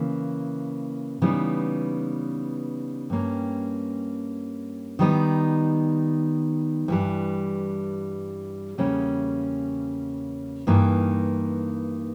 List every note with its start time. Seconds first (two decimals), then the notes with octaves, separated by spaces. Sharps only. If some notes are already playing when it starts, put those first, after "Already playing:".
Already playing: C#3 E3 A#3
1.22 C#3 E3 G3 B3 D#4
3.10 G2 G3 A#3 C#4
4.99 D#3 G3 B3 D#4
6.88 G2 E3 G3
8.78 E2 C#3 G3 A#3 C#4
10.67 G2 E3 A#3 D#4